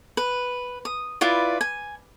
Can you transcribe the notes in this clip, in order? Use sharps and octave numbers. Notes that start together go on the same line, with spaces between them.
B4
D#6
E4 F4 B4 D5
G#5